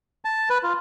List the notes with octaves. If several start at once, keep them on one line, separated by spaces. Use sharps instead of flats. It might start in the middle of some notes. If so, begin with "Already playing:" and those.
A5
B4
F4